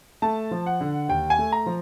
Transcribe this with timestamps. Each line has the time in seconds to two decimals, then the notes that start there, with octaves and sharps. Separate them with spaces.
0.22 A3 A5
0.51 F3
0.66 F#5
0.81 D3
1.09 D#2 G5
1.30 G#5
1.39 A3
1.52 A#5
1.66 F3